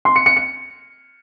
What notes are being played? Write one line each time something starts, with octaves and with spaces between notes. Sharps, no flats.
C6
C#7
C#7
C#7